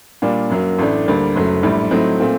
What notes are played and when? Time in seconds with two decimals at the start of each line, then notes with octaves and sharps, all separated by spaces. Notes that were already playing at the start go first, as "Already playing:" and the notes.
0.22 A#2 G3 A#3 D4
0.50 F#2 F#3 A#3
0.79 A1 A2 A3 D4
1.06 D2 D3 G3 A#3
1.35 F#1 F#2 F#3 A3
1.63 A#1 A2 G3
1.91 A2 F#3 A3 C4 D#4
2.20 A#2 A3 C4